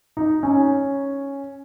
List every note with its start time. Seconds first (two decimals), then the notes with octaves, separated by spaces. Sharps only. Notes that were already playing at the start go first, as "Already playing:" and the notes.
0.17 D#4
0.43 C#4